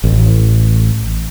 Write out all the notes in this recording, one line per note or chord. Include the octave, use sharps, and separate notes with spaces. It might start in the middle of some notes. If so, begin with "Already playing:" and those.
A1